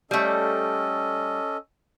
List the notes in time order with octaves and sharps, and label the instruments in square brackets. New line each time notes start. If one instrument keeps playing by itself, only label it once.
[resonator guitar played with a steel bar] G3 A3 [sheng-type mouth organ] C#4 A4 D#5